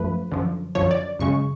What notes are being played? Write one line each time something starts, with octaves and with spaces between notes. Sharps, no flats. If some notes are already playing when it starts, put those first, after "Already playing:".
Already playing: F#2 F3 A3 B4
F#2 D3 F3
F#2 D3 F3 C#5
D5
F#2 C#3 G#3 C#6